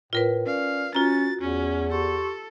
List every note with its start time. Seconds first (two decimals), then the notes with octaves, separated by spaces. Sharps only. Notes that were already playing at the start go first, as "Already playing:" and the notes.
0.13 A2 F4 A#4 B4
0.46 C#4 D5 F5
0.95 C#4 F4 F#4 A#5 A6
1.41 E2 C#4
1.91 G4 A4 C6 C#6